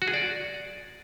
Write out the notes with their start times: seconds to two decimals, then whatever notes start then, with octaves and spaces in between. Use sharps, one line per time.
0.02 F#4
0.08 G#4
0.14 D5